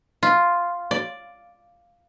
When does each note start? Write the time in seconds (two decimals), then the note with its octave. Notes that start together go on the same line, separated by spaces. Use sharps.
0.23 F4
0.91 D5